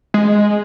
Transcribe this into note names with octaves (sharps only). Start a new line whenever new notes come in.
G#3